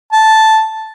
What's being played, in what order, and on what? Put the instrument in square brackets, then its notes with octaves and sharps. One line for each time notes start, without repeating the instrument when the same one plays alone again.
[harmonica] A5